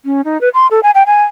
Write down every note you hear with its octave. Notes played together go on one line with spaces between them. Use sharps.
C#4
D#4
B4
C6
A4
G#5
G5
G#5